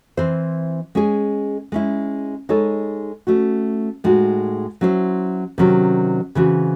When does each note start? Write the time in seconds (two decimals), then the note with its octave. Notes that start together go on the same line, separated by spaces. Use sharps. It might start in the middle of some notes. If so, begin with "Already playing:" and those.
0.17 E3 C4 E4 C5
0.95 G#3 C#4 G#4
1.72 G#3 C#4 E4
2.49 G#3 D#4 A4 C#5
3.27 A3 C#4 F#4
4.04 A2 G#3 D#4 F#4
4.81 F#3 C#4 E4 C5
5.58 C3 D#3 F#3 C#4
6.35 C#3 E3 C4 F#4